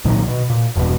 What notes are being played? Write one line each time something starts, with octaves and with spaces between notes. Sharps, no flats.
C2 A#2 D#3 F#3
B2
A#2
E1 E2 G2 B2